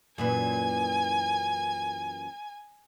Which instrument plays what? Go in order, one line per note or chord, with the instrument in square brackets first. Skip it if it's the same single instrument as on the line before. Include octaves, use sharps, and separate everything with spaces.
[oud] F#2 A#2 E3 [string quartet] G#5